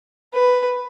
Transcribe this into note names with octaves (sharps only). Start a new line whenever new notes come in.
B4